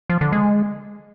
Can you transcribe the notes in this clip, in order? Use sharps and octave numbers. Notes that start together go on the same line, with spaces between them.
F3
D3
G#3